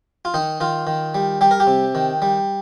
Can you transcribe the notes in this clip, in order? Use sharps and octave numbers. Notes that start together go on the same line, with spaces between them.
F4
D#3 D#4
D#3 F4
D#3
G3
G3 G4
A#4
G4
C3
D#3
G3